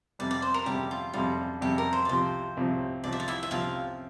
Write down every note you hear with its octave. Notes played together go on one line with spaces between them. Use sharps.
F2 C3 G3 D5
D5
C5
A#4
F2 C3 G3 G4
F4
F2 C3 G3 F4
F2 C3 G3 G4
A#4
C5
D5
C2 C3 F3 C4 C5
C2 C3 F3 C4
C2 C3 F3 C4 D5
E5
D5
E4 E5
E5
C2 C3 F3 C4 F4 F5